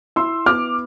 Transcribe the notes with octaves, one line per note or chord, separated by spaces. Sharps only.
E4 C6 E6
B3 D6 F6